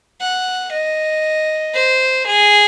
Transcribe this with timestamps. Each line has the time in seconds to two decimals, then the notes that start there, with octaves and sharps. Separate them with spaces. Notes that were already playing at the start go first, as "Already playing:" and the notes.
0.21 F#5
0.72 D#5
1.74 C5
2.27 G#4